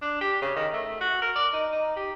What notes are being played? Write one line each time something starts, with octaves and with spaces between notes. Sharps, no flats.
D4
G4
C#3
D#3
A3
F#4
A#4
D5
D#4
D#4
G4